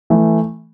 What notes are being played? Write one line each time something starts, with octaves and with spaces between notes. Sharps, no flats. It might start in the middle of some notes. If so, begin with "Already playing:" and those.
E3 A3